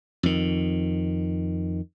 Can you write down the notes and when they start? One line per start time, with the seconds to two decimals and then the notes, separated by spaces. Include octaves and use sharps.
0.23 F2 D#3